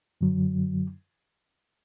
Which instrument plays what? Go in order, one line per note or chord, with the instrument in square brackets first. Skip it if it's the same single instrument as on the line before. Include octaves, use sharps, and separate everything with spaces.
[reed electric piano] F#2 D3 F#3